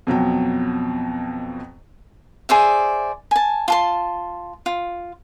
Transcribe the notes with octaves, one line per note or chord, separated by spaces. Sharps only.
F2 B2 F#3 G5
G#4 C5 D5 E5
G#5 A5
F4 A5 C6
F4